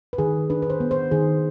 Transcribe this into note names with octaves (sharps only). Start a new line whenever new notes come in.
B4
D#3 G#4
D4 B4
B4
C5
B3
C5
D#3 G#4